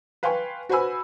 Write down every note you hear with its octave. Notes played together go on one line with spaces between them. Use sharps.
B4 F5 G5 G#5 C6 C#6
F#4 B4 C5 G#5 B5 E6